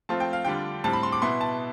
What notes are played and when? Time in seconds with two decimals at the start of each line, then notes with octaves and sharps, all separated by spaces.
0.09 F3 A3 C4 F4 A5
0.20 G5
0.33 F5
0.45 D3 G3 D4 F4 G5
0.84 A2 G3 C4 A5
0.93 B5
1.03 C6
1.13 D6
1.22 B2 B3 E4 C6
1.41 A5